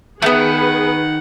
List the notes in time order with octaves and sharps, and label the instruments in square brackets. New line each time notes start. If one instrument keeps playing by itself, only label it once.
[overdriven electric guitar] D#3 [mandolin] A3 B3 [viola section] G#4 B4 [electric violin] F#5